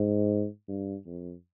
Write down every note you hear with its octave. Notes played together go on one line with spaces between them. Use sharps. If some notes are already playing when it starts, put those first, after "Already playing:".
Already playing: G#2
G2
F2